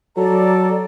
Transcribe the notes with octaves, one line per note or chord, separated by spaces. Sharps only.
F#3 A4 D5 A#5